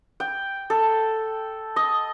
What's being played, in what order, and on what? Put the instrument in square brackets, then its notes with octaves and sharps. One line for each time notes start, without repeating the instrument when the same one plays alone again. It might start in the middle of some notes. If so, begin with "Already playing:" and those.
[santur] G5
A4
D#5